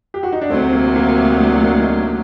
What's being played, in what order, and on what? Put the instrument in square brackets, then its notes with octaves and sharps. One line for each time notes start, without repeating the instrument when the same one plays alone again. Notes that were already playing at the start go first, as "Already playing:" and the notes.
[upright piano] G4
F#4
D#4
D4
[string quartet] D2 C3 F#3 [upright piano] A3 C4
[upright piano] A#3
A#3
A#3 D4
A#3 D4
D#4
A#3 D4